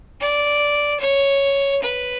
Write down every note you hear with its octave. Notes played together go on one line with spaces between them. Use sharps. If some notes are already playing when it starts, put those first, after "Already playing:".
D5
C#5
B4